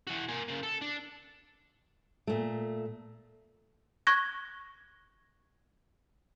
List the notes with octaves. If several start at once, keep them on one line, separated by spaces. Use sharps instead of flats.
E3 F#4
A#3 G#5
C#3 A#3
A4
D4
A#2 A3
C#6 F#6 G#6 A#6